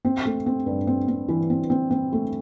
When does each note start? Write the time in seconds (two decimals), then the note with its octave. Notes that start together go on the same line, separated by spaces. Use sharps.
0.05 C4
0.25 A3
0.46 C4
0.66 G2
0.87 C4
1.08 C4
1.29 E3
1.50 C4
1.70 C4
1.91 C4
2.12 A3